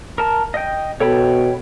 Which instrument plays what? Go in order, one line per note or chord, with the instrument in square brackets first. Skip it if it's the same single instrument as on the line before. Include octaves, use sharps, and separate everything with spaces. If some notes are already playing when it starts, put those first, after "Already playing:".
[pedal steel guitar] A#4 A5
D#5 G5
[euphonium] B2 [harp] A4 [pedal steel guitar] C#5 G5 B5